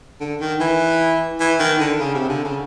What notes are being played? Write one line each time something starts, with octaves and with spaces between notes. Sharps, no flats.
D3
D#3
E3
E3
D#3
D3
C#3
C3
D3
C#3